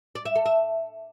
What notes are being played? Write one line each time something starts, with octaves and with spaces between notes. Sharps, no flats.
D5
E5
A4
E5